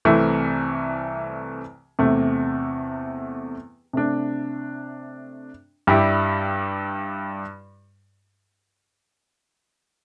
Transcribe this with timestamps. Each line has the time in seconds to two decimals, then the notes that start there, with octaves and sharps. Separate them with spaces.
0.05 C2 C3 E3 A3 E4
1.99 E2 C3 A3
3.93 C3 A3 D4
5.87 G2 G3 E4 G4